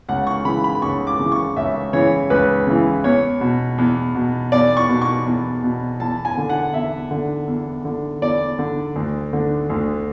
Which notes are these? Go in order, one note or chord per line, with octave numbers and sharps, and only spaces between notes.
C#2 F#5
C#6
C#3 E3 B5
B5
B5
C#2 C#6
D6
C#3 E3
C#6
C#2 E5
C#3 E3 C#5
C#2 B4
C#3 E3
E2 C#5
B2
E2
B2
E2 D5
C#6
B2
C#6
E2
B2
E2 A5
G#5
D3
F#5
E2 E5
D3
E2
D3
E2 D5
D3
D2
D3
D2